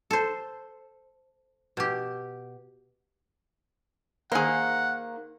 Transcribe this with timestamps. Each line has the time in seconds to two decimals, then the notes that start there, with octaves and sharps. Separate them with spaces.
0.11 A4 C5
1.77 B2 G4
4.32 D#3 A#3 G#4 C5 F#5